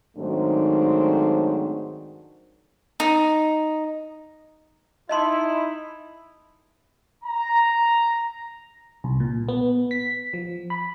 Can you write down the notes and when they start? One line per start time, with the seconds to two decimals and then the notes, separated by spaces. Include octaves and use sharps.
0.17 G#2 D#3 F#3 A3 C4 D4
3.00 D#4
5.09 D#4 E4 D#5 A5 C6
7.24 A#5
9.04 C2
9.20 A#2
9.49 B3
9.91 B6
10.34 F3
10.70 B5